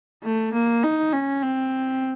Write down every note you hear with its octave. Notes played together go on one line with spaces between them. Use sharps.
A3
A#3
D#4
C#4
C4